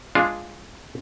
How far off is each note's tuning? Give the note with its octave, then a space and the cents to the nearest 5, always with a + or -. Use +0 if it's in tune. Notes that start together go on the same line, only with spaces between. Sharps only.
G#3 +0 D4 +5 F4 +0